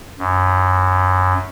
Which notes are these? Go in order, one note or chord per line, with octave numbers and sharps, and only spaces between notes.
F#2